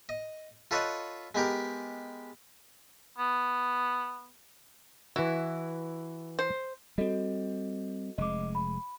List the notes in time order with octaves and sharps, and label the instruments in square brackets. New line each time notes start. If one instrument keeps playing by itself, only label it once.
[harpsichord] D#5
F4 A4 B4 C#5 D#5 F#5
G#3 B3 G4 A#4
[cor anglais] B3
[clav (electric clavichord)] E3 F#4 [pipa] E4
[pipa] C5
[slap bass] G3 C4 [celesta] F#4 A4 D#5
[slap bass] F1 G#3 [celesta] D#5 D6
[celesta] B5